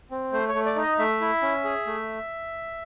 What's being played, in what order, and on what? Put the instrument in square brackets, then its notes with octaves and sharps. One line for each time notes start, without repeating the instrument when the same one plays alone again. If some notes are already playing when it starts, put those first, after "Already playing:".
[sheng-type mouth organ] C4
A3 C5
C#5
A3
D5
D#4
D#5
A3 E5
E4
C#4
G#4
A3